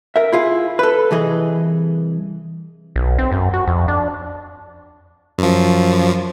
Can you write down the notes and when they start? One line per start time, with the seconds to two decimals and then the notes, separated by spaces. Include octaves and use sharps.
0.16 A#4 E5
0.32 E4 F4 G#4
0.79 A4 B4
1.11 C2 E3 G#4 D#5
2.96 B1
3.18 C4
3.32 F#2
3.53 F#4
3.68 F2
3.88 D4
5.38 F#2 F3